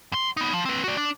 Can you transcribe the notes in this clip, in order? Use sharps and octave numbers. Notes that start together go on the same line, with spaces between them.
F#2 C6
B3 D#4
F3
C4 B4
F#4 D5
D4